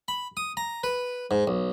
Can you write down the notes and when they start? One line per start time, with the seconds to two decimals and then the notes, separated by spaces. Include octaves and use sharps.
0.08 B5
0.37 D#6
0.57 A#5
0.84 B4
1.31 G#2
1.47 B1